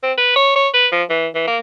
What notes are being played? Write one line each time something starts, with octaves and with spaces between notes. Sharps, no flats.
C4
B4
C#5
C#5
B4
F3
E3
E3
A#3